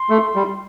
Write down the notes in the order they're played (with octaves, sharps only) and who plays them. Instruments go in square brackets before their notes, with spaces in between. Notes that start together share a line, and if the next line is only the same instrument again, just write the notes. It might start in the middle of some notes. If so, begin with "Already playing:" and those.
Already playing: [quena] C6
[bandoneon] A3
G3